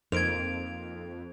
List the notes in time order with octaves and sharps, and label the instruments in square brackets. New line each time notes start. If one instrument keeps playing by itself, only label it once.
[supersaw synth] F2 [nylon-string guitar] A#3 D#4 C5 [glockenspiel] G#6 D7 F7